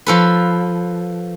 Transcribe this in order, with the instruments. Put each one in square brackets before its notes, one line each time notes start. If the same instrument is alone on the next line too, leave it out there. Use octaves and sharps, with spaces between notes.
[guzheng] F3 A4 B4